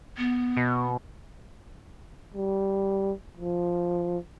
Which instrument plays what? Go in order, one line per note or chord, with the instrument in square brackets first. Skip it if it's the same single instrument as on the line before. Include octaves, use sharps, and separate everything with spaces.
[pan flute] B3
[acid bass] B2
[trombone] G3
F3